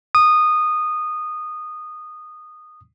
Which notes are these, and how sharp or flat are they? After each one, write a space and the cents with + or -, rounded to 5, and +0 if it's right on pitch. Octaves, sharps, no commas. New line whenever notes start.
D#6 -15